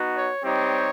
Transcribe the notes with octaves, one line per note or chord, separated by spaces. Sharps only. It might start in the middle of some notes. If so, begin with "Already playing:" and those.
Already playing: B3 D#4 F#4
C#5
G3 C4 D#4 G4 C#5